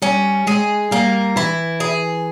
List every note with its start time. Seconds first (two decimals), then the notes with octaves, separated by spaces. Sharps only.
0.02 G3 C#4
0.47 G#3 G#4
0.91 G3 A#3
1.36 E3 E4
1.80 G#4